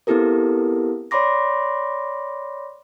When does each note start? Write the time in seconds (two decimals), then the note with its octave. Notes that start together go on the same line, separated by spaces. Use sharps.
0.07 B3 C4 E4 G4 A4 A#4
1.11 C#5 D5 B5 C6 D6 A#6